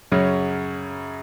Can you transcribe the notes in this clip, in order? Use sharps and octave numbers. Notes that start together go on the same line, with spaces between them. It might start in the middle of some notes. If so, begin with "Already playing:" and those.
F#2 C#3 F#3 C#4